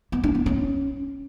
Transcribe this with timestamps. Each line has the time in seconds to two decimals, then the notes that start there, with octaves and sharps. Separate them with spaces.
0.12 B3
0.24 D4
0.35 B3
0.46 C#4